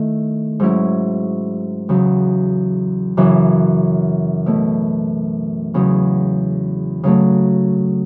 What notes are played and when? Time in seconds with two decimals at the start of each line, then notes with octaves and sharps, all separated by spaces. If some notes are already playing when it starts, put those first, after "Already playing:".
Already playing: D#3 A3 E4
0.60 G#2 F#3 C#4 E4
1.89 E2 C#3 F#3
3.17 F#2 C#3 E3
4.46 B2 A3 C#4 E4
5.74 E2 C#3 F#3
7.04 C#3 F#3 A3